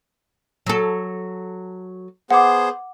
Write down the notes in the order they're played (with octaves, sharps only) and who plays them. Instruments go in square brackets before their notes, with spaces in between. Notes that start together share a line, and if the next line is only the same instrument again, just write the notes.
[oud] F#3 A4
[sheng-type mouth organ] B3 G#4 C5 [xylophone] F#5 D6